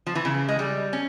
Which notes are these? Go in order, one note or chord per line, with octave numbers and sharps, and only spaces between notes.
F3
E3
C#3
G#3
G3
C#4